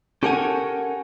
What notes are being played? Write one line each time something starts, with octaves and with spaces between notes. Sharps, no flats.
C#4 G4 A4 A#4 F#5 G#5